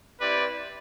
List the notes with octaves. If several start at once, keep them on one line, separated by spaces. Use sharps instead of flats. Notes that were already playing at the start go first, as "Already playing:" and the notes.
C4 E4 G4 B4 D5